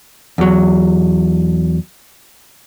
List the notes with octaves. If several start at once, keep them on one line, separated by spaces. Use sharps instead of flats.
E2 F#3